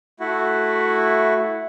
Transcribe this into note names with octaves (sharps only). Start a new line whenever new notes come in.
A3 E4 F#4